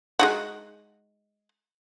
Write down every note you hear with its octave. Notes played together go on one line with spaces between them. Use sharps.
G#3 D#4 F#4